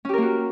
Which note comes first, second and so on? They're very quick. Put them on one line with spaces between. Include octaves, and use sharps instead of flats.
C#4 G4 A#4 A#3 F#4